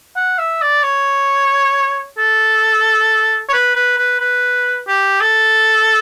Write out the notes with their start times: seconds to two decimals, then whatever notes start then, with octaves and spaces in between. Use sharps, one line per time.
0.16 F#5
0.38 E5
0.62 D5
0.83 C#5
2.18 A4
3.49 C#5
3.53 B4
3.75 B4
3.98 B4
4.20 B4
4.88 G4
5.21 A4